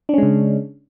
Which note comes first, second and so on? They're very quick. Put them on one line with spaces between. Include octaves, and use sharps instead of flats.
D4 C#4 G#3 C#3